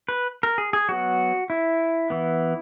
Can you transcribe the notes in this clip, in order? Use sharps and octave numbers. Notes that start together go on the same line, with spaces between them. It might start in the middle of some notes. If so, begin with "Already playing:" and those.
B4
A#4
G#4
G#4
F#3 B3 F#4
E4
E3 B3